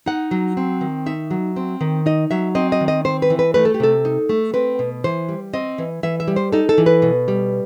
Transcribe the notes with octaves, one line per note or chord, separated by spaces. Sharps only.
D#4 F#5
F#3
C4
D#3
D#4 E5
F#3
C4
D#3
D#4 D#5
F#3 E5
C4 D#5
D#5
D#3
D#5
C4 C5
B4
E3
B4
A3 B4
A4
G4
C3 A4
D#4
A3
C4 B4
B2
E3 C5
G3
C4 D#5
E3
E3 E5
E5
G3
C5
D#4 A4
A4
E3
B4
B2
G3